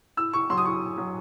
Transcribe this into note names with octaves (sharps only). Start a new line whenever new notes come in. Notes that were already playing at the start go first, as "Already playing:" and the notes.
A2 E6
A2 C#6
F#3 C6
D#6
A2 C#6
A2
F#3